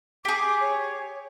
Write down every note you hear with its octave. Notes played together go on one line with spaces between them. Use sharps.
G4 G#4 D6
C#5